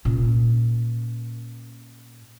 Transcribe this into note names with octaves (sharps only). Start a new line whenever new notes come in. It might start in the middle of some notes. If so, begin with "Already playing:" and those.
A#2 C#4